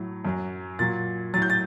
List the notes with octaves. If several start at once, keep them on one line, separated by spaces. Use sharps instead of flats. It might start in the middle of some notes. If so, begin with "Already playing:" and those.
Already playing: A2 F#3
F#2 F#3
A#2 F#3 A6
A2 F#3 A6
G6
A6